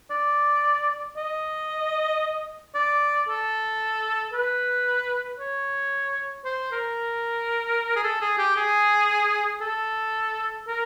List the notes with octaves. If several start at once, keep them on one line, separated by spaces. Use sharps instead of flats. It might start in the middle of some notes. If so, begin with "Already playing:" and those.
D5
D#5
D5
A4
B4
C#5
C5
A#4
G#4
A4
G#4
G4
G#4
A4
A#4